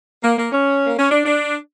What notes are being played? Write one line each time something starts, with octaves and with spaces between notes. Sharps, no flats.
A#3
A#3
C#4
A#3
C#4
D4
D4